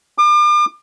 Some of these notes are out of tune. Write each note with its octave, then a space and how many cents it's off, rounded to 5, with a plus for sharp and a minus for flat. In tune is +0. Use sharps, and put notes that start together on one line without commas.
D6 +40